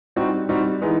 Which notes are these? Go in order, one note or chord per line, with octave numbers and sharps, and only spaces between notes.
G3 C4 D#4 F#4
G3 C4 D#4 F#4
E3 G#3 B3 D#4